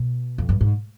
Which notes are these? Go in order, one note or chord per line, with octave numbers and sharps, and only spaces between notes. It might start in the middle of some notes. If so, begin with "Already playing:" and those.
Already playing: B2
F2
G2
G#2